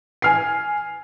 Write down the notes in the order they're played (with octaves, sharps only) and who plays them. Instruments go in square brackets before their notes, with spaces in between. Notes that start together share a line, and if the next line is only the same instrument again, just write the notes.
[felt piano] G#5 F6 C7